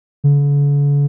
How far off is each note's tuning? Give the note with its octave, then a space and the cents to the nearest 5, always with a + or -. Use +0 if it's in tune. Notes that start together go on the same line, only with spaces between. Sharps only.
D3 -45